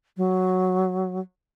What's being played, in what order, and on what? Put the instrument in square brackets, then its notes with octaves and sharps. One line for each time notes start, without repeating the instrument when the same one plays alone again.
[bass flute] F#3